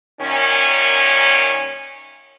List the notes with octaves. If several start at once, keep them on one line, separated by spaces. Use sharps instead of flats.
F#2 A#2 D#3 C#4